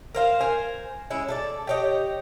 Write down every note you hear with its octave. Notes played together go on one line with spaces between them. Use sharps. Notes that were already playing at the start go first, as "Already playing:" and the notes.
A#4 C5 F5
A#4 C5 G#5
G#3 C#4 E4
A4 A#4 D5
G4 C#5 D#5